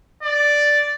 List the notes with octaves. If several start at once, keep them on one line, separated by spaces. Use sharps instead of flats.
D5